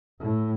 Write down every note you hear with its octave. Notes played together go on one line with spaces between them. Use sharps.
A2